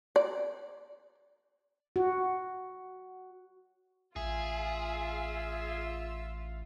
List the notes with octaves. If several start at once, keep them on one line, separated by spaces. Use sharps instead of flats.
D5
F#4
A1 F4 G#4 E5